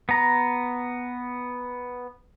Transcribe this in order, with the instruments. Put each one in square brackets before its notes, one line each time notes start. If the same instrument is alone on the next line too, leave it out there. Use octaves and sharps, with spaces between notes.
[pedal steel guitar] B3 A#5